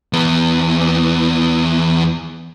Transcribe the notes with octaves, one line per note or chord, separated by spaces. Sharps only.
E2 B3